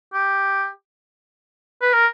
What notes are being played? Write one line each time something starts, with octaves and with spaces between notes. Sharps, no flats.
G4
B4
A#4